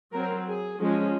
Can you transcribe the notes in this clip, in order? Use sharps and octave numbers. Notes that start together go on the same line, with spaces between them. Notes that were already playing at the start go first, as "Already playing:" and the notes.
F#3 C4 A#4
G#4
F3 G#3 C#4